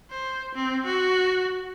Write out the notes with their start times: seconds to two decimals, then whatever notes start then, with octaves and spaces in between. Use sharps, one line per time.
0.11 C5
0.55 C4
0.86 F#4